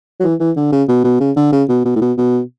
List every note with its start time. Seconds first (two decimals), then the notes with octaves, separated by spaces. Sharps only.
0.20 F#3
0.23 E3
0.40 E3
0.56 D3
0.72 C#3
0.88 B2
1.04 B2
1.20 C#3
1.36 D3
1.52 C#3
1.69 B2
1.85 B2
1.95 A2
2.01 B2
2.18 B2